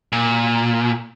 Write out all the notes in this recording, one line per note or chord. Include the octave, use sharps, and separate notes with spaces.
A#2